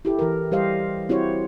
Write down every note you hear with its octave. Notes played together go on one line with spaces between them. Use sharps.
E4 G4 A4
E3 A#4
G3 G4 C5 D#5 F5
C4 E4 F#4 G4 C5 C#5